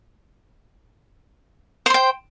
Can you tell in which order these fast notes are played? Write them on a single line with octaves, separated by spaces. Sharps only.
C5 C6 G5